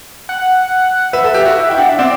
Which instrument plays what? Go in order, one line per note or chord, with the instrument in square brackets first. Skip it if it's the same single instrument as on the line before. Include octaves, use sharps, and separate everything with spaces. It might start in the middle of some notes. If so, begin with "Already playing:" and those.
[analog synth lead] F#5
[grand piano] B4 [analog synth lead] E5
[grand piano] A4
G4
F#4
E4
[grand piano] E4 [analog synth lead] G5
[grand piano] D4 [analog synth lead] F#5
[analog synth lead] E5
[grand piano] C4 [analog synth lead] D5